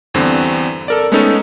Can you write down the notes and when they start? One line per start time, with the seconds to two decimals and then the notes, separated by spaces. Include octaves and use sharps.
0.14 E2 G2 D3 C4
0.88 A4 A#4 D5
1.12 G#3 A3 B3 C#4 D#4 A4